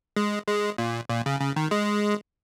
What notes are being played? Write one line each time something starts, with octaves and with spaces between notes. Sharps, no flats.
G#3
G#3
A#2
A#2
C#3
C#3
D#3
G#3